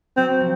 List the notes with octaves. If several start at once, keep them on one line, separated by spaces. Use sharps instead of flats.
F#3 C4 F#4
F3